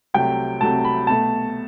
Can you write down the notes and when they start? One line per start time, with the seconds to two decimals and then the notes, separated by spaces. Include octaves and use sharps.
0.14 C2 C3 F#3 A3 G5
0.61 C2 C3 F#3 A3 A5
0.84 B5
1.07 B2 A3 A5